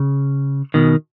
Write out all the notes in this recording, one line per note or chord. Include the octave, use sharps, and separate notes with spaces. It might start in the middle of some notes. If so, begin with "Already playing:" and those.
Already playing: C#3
B2 D#3